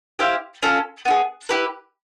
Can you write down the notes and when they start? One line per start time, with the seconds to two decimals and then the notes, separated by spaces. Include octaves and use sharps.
0.19 E4 G4 C5 F5
0.63 C#4 F4 A4
1.05 B3 D#4 G#4
1.49 E4 G4 B4